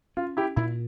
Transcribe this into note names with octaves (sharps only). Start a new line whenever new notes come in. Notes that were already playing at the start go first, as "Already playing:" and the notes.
C#4 F4
E4 G4
A#2 E4